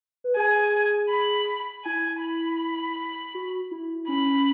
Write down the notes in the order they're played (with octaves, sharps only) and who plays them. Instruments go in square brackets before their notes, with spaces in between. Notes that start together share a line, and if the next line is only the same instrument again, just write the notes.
[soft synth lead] B4
[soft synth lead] G#4 [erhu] G#5
[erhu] B5
[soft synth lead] E4 [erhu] G#5
[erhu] B5
[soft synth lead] F#4
E4
[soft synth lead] C#4 [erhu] B5